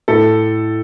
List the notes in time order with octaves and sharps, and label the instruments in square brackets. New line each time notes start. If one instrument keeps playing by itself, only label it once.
[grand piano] A2 [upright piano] A4